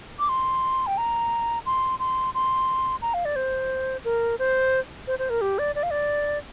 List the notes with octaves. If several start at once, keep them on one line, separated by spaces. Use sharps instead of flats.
D6
C6
G5
A#5
C6
C6
C6
A#5
F5
D5
C5
A#4
C5
C5
C5
A#4
G4
D5
D5
F5
D5